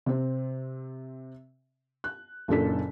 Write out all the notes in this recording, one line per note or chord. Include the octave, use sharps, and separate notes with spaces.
C3 C4
F#6
F#1 A#2 D4 A4 B6